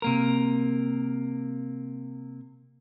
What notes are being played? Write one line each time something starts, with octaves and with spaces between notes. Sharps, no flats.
C3 A#3 A#4